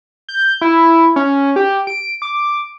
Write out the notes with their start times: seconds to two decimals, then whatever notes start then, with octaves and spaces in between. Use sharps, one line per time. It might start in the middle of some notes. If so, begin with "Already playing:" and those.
0.29 G6
0.61 E4
1.16 C#4
1.56 G4
1.87 D7
2.22 D6